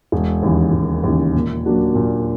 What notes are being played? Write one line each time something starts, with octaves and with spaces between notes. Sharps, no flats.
E1
D#2 C#3 E3
E1
D#2 C#3 E3
A#2
F#3 A#3 D4 F#4
A#2